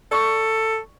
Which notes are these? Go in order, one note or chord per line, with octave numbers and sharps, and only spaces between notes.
A4 D5 C#6 D#6